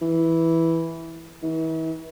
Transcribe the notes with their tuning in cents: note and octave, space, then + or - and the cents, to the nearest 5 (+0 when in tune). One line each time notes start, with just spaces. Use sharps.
E3 -5
E3 -40